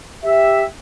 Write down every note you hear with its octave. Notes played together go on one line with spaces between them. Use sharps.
G4 E5